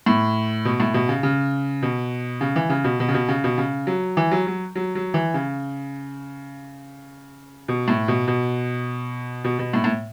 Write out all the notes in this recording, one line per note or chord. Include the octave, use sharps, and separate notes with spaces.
A2
B2
A2
B2
C#3
C#3
B2
C#3
E3
C#3
B2
B2
C#3
B2
C#3
B2
C#3
F#3
E3
F#3
F#3
F#3
F#3
E3
C#3
B2
A2
B2
B2
B2
B2
A2
A2